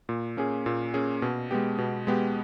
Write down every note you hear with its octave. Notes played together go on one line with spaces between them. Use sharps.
A#2
A#3 C#4 G#4
A#2
A#3 C#4 G#4
B2
G#3 B3 G4
B2
G#3 B3 G4